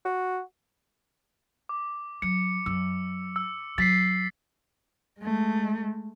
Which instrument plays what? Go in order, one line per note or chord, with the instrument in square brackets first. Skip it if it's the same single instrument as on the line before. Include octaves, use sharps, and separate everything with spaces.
[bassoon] F#4
[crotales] D6
[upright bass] F#3 [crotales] C#7
[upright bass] F#2 [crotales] E6
[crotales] E6
[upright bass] F#3 [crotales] A6 B6 C7
[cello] G#3 A3